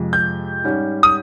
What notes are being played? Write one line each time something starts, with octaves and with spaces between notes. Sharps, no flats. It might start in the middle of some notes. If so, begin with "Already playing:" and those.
Already playing: F2 C3 F3 G#3
G6
G#2 G3 C#4
D#6